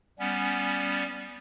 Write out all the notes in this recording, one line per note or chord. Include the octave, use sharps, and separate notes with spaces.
G3 B3 C#4